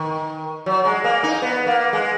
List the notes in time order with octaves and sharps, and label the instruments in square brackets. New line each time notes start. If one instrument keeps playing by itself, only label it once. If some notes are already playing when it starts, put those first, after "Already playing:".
Already playing: [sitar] D#3
F#3
G#3
A#3
D#4
B3
A#3
G#3